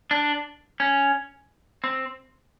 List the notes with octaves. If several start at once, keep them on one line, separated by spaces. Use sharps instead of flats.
D4
C#4
C4